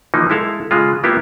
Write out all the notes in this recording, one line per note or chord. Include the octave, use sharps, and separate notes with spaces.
E3 F3 A#3 D#4
G#3 E4 A4 F5
C#3 G#3 F4
A#3 B3 E4 F4 G4